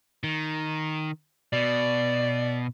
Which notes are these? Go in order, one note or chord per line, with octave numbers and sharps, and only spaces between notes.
D#3
B2 D5